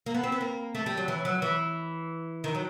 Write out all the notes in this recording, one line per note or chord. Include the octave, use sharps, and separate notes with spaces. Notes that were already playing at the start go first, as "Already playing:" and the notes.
A#3
B3
C4
B3
A#3
A3
G3
F#3
E3
F#3
E3
D#3
F#3